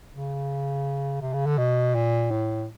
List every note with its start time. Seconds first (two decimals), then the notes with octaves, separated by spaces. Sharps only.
0.13 C#3
1.21 C3
1.33 C#3
1.46 D3
1.58 B2
1.95 A#2
2.31 A2